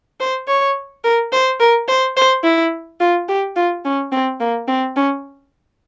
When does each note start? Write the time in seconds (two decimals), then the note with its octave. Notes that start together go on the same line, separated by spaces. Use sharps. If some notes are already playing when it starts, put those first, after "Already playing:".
0.20 C5
0.47 C#5
1.04 A#4
1.32 C5
1.60 A#4
1.88 C5
2.17 C5
2.44 E4
3.00 F4
3.29 G4
3.56 F4
3.85 C#4
4.12 C4
4.40 A#3
4.68 C4
4.96 C#4